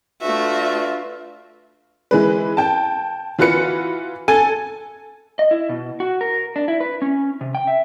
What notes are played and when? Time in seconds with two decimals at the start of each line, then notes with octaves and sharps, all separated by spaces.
0.22 A3 D4 F4 F#4 B4 E5
2.11 E3 G#3 B4
2.57 G5 A5
3.39 E3 F4 F#4 B4 C#7
4.28 A4 G#5
5.39 D#5
5.51 E4
5.69 B2
6.00 F#4
6.21 A#4
6.56 D4
6.68 E4
6.81 B4
7.02 C#4
7.41 C3
7.55 G5
7.67 E5